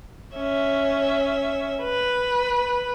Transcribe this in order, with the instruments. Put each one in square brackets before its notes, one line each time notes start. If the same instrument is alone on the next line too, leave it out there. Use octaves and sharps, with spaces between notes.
[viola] C#4 E5
B4